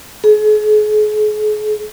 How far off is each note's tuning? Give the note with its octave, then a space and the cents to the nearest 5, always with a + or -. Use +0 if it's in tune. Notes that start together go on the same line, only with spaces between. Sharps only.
G#4 +40